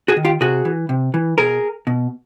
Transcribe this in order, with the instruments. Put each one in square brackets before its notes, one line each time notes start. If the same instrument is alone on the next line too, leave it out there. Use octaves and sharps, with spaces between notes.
[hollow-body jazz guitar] F#4 G#4
D#3
F4 G4
C3 F#4 G#4
E3
C3
E3
B2 G#4 A#4
B2